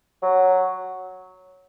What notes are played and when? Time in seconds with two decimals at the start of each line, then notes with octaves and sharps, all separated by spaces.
0.23 F#3